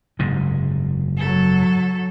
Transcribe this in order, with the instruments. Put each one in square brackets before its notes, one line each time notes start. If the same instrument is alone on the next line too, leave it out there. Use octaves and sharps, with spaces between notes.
[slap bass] F#1 G#2 C3
[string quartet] F#3 A4